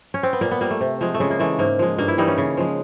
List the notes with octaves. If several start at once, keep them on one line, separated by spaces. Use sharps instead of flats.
C#4
C4
B3
A#2 A#3
B3
G3 A#3
A3
C3
F3 G#3
A3
C#3 G#3
A#3
E3 G#3 A3
G#2 A#3
F3 G#3
G2 A#3
E4
E3 G3 D#4
C#4
C#3
F3 G#3